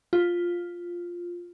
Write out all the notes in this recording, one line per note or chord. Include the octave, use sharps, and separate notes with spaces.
F4